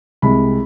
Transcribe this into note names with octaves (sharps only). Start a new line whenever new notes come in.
C2 C3 G#3 B5